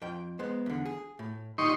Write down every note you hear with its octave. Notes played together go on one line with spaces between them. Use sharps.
F2 G5
G#3 B3 C5
E2 D3
G#4
A2
A#2 D#3 G3 D#4 C6 C#6